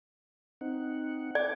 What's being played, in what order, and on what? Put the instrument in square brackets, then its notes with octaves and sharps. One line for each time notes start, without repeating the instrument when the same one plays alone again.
[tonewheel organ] C4 D#4 F#5
[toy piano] D5 [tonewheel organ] D6